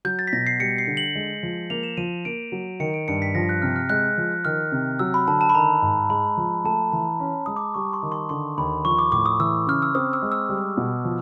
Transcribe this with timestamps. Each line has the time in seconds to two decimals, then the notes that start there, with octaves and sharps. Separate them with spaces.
0.05 F#3 G6
0.19 A6
0.27 B6
0.33 B2 A#6
0.47 C7
0.60 G3 C#7
0.78 C7
0.87 D3
0.97 F#7
1.15 G#3
1.43 F3
1.70 A#3 F7
1.83 E7
1.97 F3 D#7
2.25 A#3 D7
2.52 F#3
2.80 D#3 C#7
2.94 D7
3.08 G2 C#7
3.22 B6
3.35 F3 A#6
3.49 F#6
3.62 C3 F6
3.76 F6
3.89 G#3 F#6
4.18 F3
4.45 D#3 F6
4.72 C3
4.99 F#3 E6
5.14 B5
5.27 D3 A5
5.41 A5
5.49 B5
5.54 D#3 A#5
5.82 G#2
6.09 G#3 B5
6.37 F3
6.64 A3 A5
6.92 E3 A#5
7.20 C#4 B5
7.46 G#3 D#6
7.56 D6
7.74 G3 C#6
7.93 C6
8.03 D#3
8.12 C6
8.29 D3 C6
8.57 D#2 B5
8.85 F3 C#6
8.99 D6
9.12 A2 D6
9.26 D#6
9.40 E3 E6
9.67 C#3 F6
9.82 E6
9.95 C4 D#6
10.13 E6
10.22 G#3
10.32 E6
10.49 G3
10.77 B2
11.05 F3